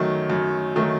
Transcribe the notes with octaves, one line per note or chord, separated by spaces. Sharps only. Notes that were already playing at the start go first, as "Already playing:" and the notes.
Already playing: F#2 D#3 F#3 A3
F#2
D#3 F#3 A3